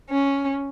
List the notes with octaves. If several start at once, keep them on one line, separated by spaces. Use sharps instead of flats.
C#4